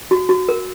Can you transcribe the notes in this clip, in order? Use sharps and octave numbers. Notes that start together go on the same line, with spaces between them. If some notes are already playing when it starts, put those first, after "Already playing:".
F#4
F#4
A#4